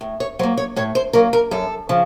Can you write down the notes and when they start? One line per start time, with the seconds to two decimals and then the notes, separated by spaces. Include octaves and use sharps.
0.01 A2
0.20 C#5
0.39 F#3 C5
0.43 A#3
0.57 C#5
0.76 A2 C#5
0.95 C5
1.13 F#3 A#3 A#4
1.33 A#4
1.51 F#2 A4
1.89 C#3 F3